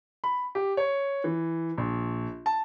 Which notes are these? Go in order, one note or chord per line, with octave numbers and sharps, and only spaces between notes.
B5
G4
C#5
E3
A#1
A5